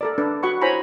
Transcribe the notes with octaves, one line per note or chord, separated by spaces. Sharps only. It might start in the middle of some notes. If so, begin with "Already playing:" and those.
A4 A#4 D5
D4 B4
F#4 F#5 B5 C#6
E4 C5 C#5 G#5 A#5 B5